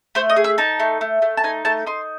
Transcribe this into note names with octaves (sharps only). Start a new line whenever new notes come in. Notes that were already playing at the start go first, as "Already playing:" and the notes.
A3 C5
D#5
G#4
E5
D#4 A5
A3
A3
A3
A5
D#4 G#5
A3 A5
D#4 C6